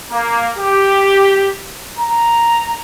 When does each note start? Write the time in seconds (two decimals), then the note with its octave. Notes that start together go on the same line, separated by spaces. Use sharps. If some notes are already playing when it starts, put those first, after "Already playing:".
0.11 A#3
0.58 G4
1.98 A#5